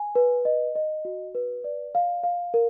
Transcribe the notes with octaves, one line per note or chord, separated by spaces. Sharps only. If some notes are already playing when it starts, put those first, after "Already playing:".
Already playing: G#5
B4
D#5
D#5
F#4
B4
D5
F5
F5
A#4